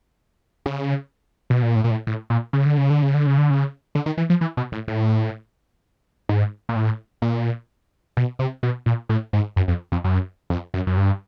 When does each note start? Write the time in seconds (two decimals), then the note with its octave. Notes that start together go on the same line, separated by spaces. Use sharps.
0.66 C#3
1.50 B2
1.62 A#2
1.76 A2
1.84 A#2
1.91 A2
2.07 A2
2.30 A#2
2.53 C#3
2.66 D3
2.78 C#3
2.90 D3
3.02 C#3
3.14 D3
3.27 C#3
3.38 D3
3.50 C#3
3.95 D3
4.06 D#3
4.18 E3
4.30 F3
4.41 E3
4.57 B2
4.72 A2
4.88 A2
6.29 G#2
6.69 A#2
6.76 A2
7.22 A#2
8.17 B2
8.39 C3
8.63 B2
8.86 A#2
9.09 A2
9.33 G#2
9.56 F#2
9.68 F2
9.92 F2
10.04 F#2
10.50 F2
10.74 F#2
10.87 F#2
10.97 G2